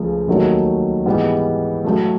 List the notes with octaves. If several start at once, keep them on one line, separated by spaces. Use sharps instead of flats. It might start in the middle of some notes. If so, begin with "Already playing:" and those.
Already playing: C#2 C#3 F3 A3
D#2 D#3 F#3 A3 C#4
G#2 E3 G3 B3
A2 F#3 A3